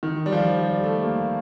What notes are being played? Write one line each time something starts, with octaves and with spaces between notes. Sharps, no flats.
D#3
G3
F3
G3
A3
A#3